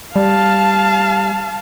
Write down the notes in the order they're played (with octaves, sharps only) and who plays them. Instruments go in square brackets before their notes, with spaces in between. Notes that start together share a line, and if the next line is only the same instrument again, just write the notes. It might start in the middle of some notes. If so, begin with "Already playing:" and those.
[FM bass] G3 [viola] F5 A5